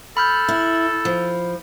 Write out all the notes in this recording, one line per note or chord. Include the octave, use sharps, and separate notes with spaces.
A4 B5 F6 G6
E4
F3